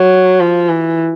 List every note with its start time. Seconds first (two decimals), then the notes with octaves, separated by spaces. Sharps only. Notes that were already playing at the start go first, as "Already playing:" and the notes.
Already playing: F#3
0.40 F3
0.69 E3